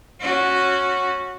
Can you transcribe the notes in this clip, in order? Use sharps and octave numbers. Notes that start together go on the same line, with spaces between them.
C#4 F#4